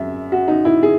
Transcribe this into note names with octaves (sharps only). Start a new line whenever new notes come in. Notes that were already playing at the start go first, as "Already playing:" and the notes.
Already playing: F#2 G#3 E5
F#4
D#4
E4
G#4